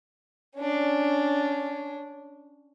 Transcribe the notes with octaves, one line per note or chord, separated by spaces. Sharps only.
C#4 D4